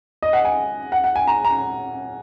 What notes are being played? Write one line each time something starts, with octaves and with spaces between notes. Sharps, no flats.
D#5
F#5
G#5
F#5
F#5
G#5
A#5
A#5